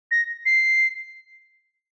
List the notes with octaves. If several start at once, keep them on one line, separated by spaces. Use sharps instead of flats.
A#6
C7